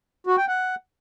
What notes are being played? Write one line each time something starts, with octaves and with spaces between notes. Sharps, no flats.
F#4
G5
F#5